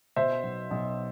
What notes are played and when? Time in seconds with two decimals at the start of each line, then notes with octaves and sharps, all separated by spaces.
0.16 B2 C5 E5
0.43 B1
0.71 B1